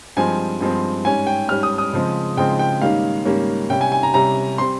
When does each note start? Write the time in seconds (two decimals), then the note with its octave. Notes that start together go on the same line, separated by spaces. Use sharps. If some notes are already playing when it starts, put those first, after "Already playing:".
0.17 G2 F3 G#3 C4 G#5
0.61 G2 F3 G#3 C4
1.05 G#2 G3 C#4 G#5
1.27 G5
1.49 G#2 G3 C#4 F6
1.63 D#6
1.78 D#6
1.93 C#3 F3 G#3 C4
2.37 C#3 F3 G#3 C4 G5
2.59 G5
2.82 G#2 D#3 G3 A#3 C#4 F5
3.25 G#2 D#3 G3 A#3 C#4
3.70 C3 G3 C#4 G5
3.81 G#5
3.92 G#5
4.03 A#5
4.14 C3 G3 C#4 A#5
4.58 G3 C4 C6